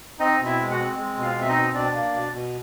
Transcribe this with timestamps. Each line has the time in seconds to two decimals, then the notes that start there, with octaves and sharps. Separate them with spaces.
0.19 C4 D#4 D#5
0.39 B2
0.45 E4 E5
0.59 G#3
0.71 F#4 F#5
0.78 C4
0.96 G#3
1.16 B2
1.23 F4 F5
1.36 C4
1.41 E5
1.49 D#4 D#5
1.55 B2
1.74 B2 D4 D5
1.94 A#3
2.13 B2
2.33 B2